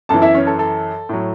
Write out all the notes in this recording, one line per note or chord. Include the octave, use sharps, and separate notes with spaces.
F#2 E3 A4 A5
E4 E5
C#4 C#5
A4
A4
A2 F#3